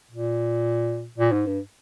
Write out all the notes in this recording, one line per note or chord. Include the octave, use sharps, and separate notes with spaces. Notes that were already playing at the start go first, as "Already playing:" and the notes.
A#2
A#2
G#2
G2